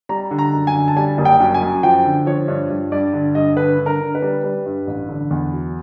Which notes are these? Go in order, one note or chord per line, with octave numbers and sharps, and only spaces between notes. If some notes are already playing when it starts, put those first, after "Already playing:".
G3 A#5
D3
A#5
F#2
G#5
D3
A5
G3 G#5
F#1
G5
F#2
G#5
F#2
F3 G5
D3
F3 C#5
G2
G2
G2 D5
D3
G2 D#5
D3 B4
D3
A#4
D3
B4
G3
G3
G2
A1
D3
E2
F#3